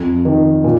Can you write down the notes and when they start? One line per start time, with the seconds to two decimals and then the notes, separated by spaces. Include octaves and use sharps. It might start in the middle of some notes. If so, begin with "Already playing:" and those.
Already playing: F2
0.25 D#3
0.64 A#2